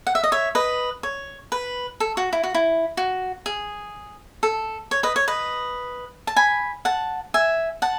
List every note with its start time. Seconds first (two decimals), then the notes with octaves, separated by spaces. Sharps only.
0.07 F#5
0.15 E5
0.24 D#5
0.32 C#5 E5
0.55 B4 D#5
1.03 C#5
1.52 B4
2.00 A4
2.17 F#4
2.33 E4
2.43 F#4
2.54 E4
2.97 F#4
3.46 G#4
4.43 A4
4.91 C#5
5.03 B4 D#5
5.16 C#5
5.28 B4 D#5
6.27 A5
6.36 G#5 B5
6.85 F#5 A5
7.34 E5 G#5
7.82 F#5 A5